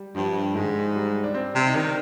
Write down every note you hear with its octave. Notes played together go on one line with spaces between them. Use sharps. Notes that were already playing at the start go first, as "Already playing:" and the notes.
Already playing: G3
G2 F3
G#2 D#3
G3
D4
C4
C3
D#4
D#3 D4